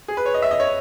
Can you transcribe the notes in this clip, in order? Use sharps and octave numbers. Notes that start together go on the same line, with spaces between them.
G#4
B4
C#5
D#5
E5
D#5
C#5